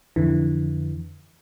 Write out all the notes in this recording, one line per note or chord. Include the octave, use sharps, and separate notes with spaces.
F2 D3 E3